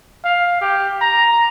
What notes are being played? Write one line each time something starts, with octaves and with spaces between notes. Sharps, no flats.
F5
G4
A#5